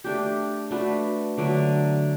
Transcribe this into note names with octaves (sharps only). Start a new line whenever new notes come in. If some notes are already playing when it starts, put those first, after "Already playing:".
A3 D4 G4
A3 D4 F#4 B4
D3 F#3 A3